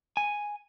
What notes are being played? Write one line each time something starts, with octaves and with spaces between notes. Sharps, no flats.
G#5